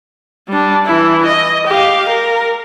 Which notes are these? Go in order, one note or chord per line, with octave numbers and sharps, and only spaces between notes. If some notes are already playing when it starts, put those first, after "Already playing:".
G3 D4
E3 E4
D#5
G4 F5
A#4